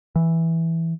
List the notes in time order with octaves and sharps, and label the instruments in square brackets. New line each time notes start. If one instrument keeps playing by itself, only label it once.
[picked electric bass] E3